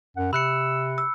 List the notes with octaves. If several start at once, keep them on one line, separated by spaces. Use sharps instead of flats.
F#2 F#5
C3 B5 E6 F#6 C#7
E6